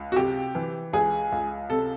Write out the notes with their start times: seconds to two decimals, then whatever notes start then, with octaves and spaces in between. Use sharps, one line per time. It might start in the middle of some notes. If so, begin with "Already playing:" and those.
Already playing: C#2
0.12 F#4
0.16 C3 G4
0.55 E3
0.93 C#2 G#4
1.32 C#2
1.70 C3 A4